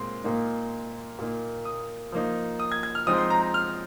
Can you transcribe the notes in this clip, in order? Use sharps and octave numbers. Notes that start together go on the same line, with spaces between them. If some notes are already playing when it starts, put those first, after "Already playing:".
Already playing: A#2 G#3 C4 C6
A#2 A#3 D#4
A#2 A#3 D#4
D#6
F3 A#3 D#4
D#6
G#6
G#6
F6
F3 G#3 C4 D#4 D#6
C6
A#5
A#5
F6